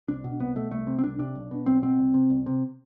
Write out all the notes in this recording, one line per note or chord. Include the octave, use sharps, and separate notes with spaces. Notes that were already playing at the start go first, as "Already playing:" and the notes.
C2 D4
B2
C2 B3
B2 A3
C2 A3
C3
C4
C2 D4
C3 D4
B1
B2
B1 C4
B2 C4
C2
C3
C2
C3